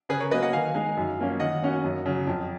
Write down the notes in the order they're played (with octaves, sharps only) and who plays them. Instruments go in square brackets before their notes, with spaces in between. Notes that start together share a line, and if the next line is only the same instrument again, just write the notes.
[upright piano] C#3 [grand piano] G#4 B4
[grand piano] A#4 C#5
[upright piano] F#3 [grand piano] B4 D#5
[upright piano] A#3
[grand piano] D#5 F#5
[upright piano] D#3 [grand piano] F5 G#5
[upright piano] G#3 D#4 G#4
F#2
F3 A#3 C#4
[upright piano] D#3 [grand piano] D#5 F#5
[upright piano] A#3 C#4 F#4
F#2
C#3 F#3
F2